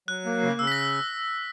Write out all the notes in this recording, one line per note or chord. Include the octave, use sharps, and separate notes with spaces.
F#3 F#6
A#3
C#3
C#3 E6
B6
A#6